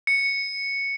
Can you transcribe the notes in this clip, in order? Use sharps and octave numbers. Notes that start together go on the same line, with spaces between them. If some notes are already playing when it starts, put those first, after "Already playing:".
C#7